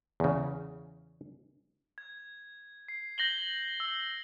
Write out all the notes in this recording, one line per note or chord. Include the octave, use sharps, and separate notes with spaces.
E2 C#3
G#6
C7
G6 A#6 F#7 G7
E6